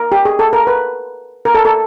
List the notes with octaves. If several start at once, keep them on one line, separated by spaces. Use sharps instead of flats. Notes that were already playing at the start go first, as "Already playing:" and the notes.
Already playing: A#4
G4
G#4
A4
A#4
B4
A#4
A4
A4